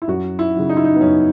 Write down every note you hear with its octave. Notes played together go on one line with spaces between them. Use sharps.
E4
F#2 F#4
E4
C#3 F#3
D#4
E4
D#4
B3
F#2 C#4